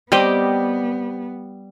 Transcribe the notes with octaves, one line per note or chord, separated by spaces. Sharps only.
G3 B3 C4 G4 D#5 G5